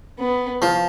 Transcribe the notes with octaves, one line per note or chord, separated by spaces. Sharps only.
B3
F3